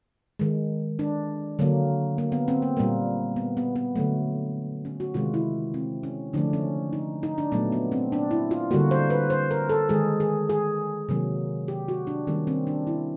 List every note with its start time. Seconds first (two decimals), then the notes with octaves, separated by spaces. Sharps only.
0.39 D#3 G#3
0.99 D4
1.59 D3 F#3 A#3
2.18 A#3
2.32 B3
2.48 C4
2.62 A#3
2.77 A#2 G3 A#3
3.36 B3
3.57 B3
3.76 B3
3.96 D3 F#3 A3
4.85 C#4
5.00 F#4
5.14 C3 D#3 G#3 F4
5.34 E4
5.74 C4
6.03 C#4
6.33 D3 F3 A3 D4
6.53 C#4
6.93 D#4
7.23 D#4
7.38 D4
7.52 A#2 F#3 A3 B3
7.72 B3
7.92 C4
8.12 D4
8.31 E4
8.51 F4
8.71 D3 G3 A#3 F#4
8.91 C5
9.10 B4
9.30 C5
9.51 A#4
9.69 A4
9.89 D#3 G#3 G#4
10.20 G#4
10.50 G#4
11.09 C3 D#3 F#3 A#3
11.68 G4
11.88 F#4
12.07 D4
12.27 D#3 G3 A#3 C#4
12.47 C4
12.67 D4
12.87 E4